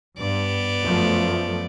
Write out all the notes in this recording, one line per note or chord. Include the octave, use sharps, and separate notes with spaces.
G2 B3 D5
F#2 F3 A3